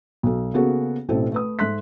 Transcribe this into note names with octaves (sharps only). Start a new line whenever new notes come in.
B1 A4
C#3 A#3 B3 F#4 G#4 A4
A1 B2 C4 E4 A4
A3 B4 D#6
G#2 A4 E5 C6 F#6 B6